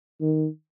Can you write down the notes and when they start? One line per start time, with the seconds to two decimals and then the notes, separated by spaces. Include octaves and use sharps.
0.21 D#3